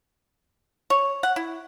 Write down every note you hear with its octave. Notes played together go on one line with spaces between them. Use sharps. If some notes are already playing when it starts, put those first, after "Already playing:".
C#5
F#5
E4